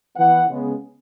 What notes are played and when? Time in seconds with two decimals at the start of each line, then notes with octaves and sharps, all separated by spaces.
0.16 E3 B3 F#5
0.48 C#3 G#3 B3